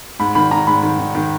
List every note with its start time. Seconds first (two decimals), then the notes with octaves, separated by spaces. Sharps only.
0.19 G#2 B5
0.35 D#3 B5
0.51 D#3 A#5
0.67 G#2 B5
0.83 D#3
0.99 D#3
1.15 D#3